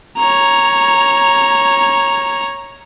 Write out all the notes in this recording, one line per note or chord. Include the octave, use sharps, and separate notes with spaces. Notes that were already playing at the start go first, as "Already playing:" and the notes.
C#5 A#5